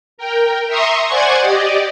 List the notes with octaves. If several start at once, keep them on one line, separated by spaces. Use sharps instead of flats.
A#4 G5
E5 A#5 C6 C#6 D#6
C5 D5 F#5 G#5 C#6 G#6
G4 D5 D#5